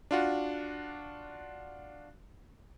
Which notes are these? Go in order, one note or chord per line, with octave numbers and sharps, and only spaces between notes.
D4 F4 F#4